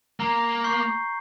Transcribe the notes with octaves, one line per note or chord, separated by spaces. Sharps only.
A#3 A#5
C#6 G6 C7 G7